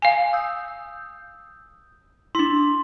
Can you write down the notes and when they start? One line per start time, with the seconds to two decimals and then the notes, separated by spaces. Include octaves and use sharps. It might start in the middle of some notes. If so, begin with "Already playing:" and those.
0.02 F5 G#5
0.33 D#6 E6 G6
2.35 D4 E4 C6